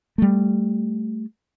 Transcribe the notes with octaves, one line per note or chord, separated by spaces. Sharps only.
G3 A3